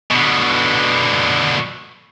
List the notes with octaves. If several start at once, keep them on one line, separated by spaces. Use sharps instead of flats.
B2 D3